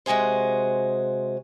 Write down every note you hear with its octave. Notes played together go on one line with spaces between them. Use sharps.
C3 G#3 F#4 G#4 C5